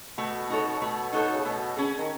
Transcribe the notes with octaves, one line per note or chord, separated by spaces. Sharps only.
B2 A3
D#4 F#4 A4 C#5
B2 A3
D#4 F#4 A4 C#5
C#3
B2 A3
C#4 G#4
D#3